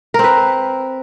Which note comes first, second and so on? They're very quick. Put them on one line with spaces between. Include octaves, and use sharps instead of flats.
A#4 C4 B4